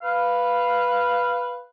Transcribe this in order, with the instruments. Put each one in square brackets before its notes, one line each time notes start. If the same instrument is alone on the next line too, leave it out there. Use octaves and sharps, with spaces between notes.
[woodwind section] B4 F5